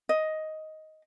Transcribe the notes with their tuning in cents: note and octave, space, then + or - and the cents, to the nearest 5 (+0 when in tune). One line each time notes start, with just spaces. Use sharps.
D#5 +10